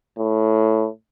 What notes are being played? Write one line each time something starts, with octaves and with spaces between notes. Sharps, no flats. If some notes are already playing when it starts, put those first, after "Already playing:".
A2